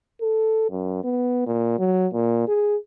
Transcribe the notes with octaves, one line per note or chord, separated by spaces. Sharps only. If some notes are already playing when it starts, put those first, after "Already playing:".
A4
F#2
B3
A#2
F#3
A#2
G#4